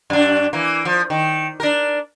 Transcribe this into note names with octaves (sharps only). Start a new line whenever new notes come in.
F#2 D4
E3 A#3
F3
D#3
D4 A#4